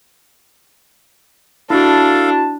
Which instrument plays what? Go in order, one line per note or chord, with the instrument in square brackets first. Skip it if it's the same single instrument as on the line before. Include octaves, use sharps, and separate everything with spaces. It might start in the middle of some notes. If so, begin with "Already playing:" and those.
[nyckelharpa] D4 [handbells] E4 F#4 [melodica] A4 F5 [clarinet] A5